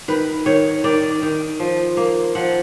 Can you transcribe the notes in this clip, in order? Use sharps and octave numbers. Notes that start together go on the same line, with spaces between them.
D#3 B4
D#3 C#5
D#3 D5
D#3
F3
A#3
F3 F#5